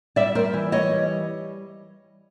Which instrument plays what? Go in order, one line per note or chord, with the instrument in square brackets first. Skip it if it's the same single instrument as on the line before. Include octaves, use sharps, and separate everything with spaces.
[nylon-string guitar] G3 D5 E5
A#4 C5
E3
C#5 D#5
G3